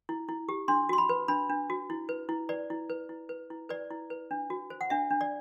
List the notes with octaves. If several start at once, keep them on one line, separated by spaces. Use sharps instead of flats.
E4
E4
G4
D4 C6
F#4 C6
B5
B4
D4 B5
D4
F#4
E4
B4
E4
B4 D5
E4
B4
E4
B4
E4
B4 D5
E4
B4
D4
F#4
C5
F#5
D4 E5
D4
D5